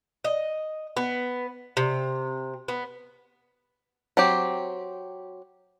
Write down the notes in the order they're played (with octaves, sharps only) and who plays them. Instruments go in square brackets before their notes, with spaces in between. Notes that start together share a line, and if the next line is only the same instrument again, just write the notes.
[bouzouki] D#5
B3
C3
B3
[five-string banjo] F#3 C4 G4